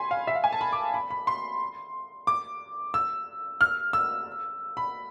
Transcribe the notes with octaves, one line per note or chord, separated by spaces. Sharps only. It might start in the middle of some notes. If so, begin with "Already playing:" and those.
Already playing: G#5 B5 C6
F5
E5
F5
G#5
A5
B5
D6
B5
B5
C6
D6
E6
F6
E6
B5